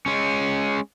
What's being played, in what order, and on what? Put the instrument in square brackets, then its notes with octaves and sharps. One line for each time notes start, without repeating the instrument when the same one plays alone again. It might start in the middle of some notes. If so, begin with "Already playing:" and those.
[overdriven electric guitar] G#3 C#4